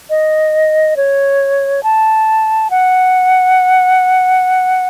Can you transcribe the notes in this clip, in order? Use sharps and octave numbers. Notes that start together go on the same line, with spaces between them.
D#5
C#5
A5
F#5